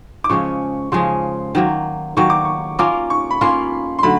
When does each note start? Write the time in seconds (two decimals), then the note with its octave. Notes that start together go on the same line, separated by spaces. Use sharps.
0.24 D6
0.29 C#3 F3 G#3 C#4 C#6
0.92 C#3 F3 G#3 C#4 C6
1.55 D#3 F#3 A#3
2.17 D#3 F#3 A#3 C#6
2.30 D6
2.45 C#6
2.79 A#3 C#4 F4 A#4 D6
3.10 C#6
3.31 B5
3.41 A#3 C#4 F4 A#4 C6
3.99 C6
4.03 D3 F#3 A3 B5